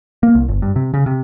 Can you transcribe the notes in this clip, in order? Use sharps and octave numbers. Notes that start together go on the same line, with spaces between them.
A#3
C2
G1
G2
C3
C#3
C3